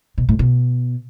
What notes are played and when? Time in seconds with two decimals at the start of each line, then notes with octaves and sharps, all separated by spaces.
0.18 B2
0.29 A2
0.39 B2